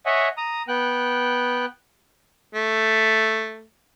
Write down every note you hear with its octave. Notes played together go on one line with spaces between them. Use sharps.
C#5 D#5 E5 F#5 G#5
A#5 D#6
B3 G5 F#6
A3